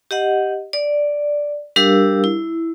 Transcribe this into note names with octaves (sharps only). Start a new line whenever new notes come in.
G4 D#5 F#5
D5
G3 D4 G4 A#4 F5 E6
E4